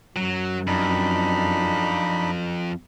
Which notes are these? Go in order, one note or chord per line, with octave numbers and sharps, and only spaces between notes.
F#2 F#3
F2 D4 D#4 B5